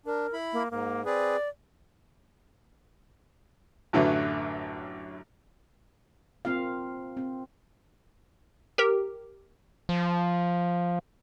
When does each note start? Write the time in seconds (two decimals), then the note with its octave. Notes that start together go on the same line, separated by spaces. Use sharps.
0.06 D4 A#4
0.33 E4 B5
0.53 A#3
0.71 G#2 A#3
1.05 C4 G#4 B4 D5
3.93 A1 F#2 D3 F#3 A3 B4
6.45 A#3 C4 F4 F5
7.17 C4
8.78 G4 A#4
9.89 F3